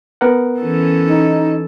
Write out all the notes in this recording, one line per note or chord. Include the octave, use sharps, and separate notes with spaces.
B3 A#4 F#5
E3 C#4 A4
D#4